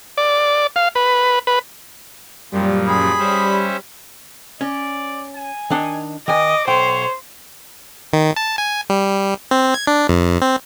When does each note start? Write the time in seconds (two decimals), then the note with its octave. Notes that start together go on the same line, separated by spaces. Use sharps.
0.18 D5
0.76 F5
0.95 B4
1.47 B4
2.52 F#2 A#2 F3 G3
2.88 G#4 B5
3.19 G3 C#4 C5 E5
4.61 C#4 D5
5.36 G#5
5.70 D#3 D4 D#4
6.28 D#3 D#5 G#5 D6
6.67 B1 C5 C#5 G5
8.13 D#3
8.36 A5
8.58 G#5
8.90 G3
9.51 C4
9.74 G#6
9.87 D4
10.09 F2
10.42 C4